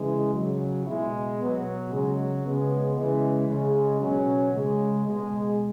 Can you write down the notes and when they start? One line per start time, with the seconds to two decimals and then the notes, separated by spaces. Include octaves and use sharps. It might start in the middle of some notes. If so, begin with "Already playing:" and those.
Already playing: C#3 E3 G#3
0.34 C#3 F#3
0.86 B2 G#3 E4
1.39 B2 F#3 B3
1.91 C#3 F#3 G#3
2.44 C#3 G#3 B3
2.96 C#3 E3 G#3
3.48 C#3 G#3
4.00 B2 F#3 C#4
4.52 C#3 G#3
5.05 B2 G#3